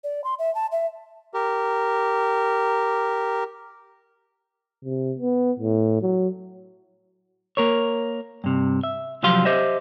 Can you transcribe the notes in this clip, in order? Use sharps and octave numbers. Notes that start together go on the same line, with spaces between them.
D5
C6
E5
A5
E5
G4 A#4
C3
B3
A2
F#3
A#3 A#4 C#5
G2 C3
E5
C2 F3 F#3 G4 F5 C6
G4 C5 D#5 E5